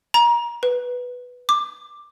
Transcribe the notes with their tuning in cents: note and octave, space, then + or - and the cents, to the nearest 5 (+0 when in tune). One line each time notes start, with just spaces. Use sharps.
A#5 +30
B4 +0
D6 +10